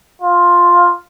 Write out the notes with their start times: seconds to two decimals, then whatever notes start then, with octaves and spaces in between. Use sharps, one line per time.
0.22 F4